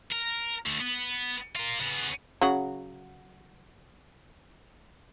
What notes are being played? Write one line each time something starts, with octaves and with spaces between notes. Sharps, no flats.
A#4
D2 A3
B3
F4 A#4
C#3 B3
C#3 F#3 F#4